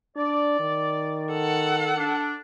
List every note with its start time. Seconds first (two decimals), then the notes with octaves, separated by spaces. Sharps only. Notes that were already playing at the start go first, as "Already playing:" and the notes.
0.16 D4 D5
0.60 D#3
1.32 A4 F#5
1.96 D4